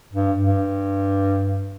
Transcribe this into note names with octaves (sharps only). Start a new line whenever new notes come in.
G2
G2